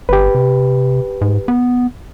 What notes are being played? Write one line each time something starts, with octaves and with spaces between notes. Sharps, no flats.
G1 G4 B4
C3
G#2
B3